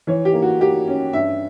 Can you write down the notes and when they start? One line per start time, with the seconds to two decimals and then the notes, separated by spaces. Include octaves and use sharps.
0.07 E3 C#5
0.25 G4
0.34 A#3
0.42 F#4
0.60 A#3 G4
0.88 C#4
1.13 G2 E5